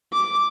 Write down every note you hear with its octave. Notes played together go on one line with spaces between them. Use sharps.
D6